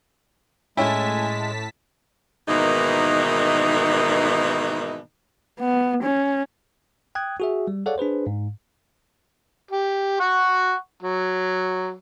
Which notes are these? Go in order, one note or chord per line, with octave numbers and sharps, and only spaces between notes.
A2 G#3 C#4 E4 G#5 A5 B6
G#2 B2 D#3 E3 A#3 D#4
B3
C#4
G5 D#6 F#6 G#6
F#4 G#4 E5
G3
G#4 A4 C#5 D5 F5 F#5
D4 G#4 B4 C5
G#2
G4
F#5 C#6
F#3